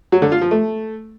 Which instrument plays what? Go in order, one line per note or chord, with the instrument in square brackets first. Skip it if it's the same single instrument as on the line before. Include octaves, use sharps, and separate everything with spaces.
[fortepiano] F#3
D3
F4
F3
A3